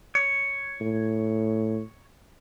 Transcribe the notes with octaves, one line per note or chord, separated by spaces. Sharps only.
C#5
A2